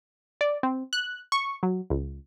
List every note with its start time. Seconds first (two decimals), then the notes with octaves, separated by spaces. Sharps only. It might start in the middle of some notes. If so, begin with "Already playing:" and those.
0.41 D5
0.63 C4
0.93 F#6
1.32 C#6
1.63 F#3
1.90 C#2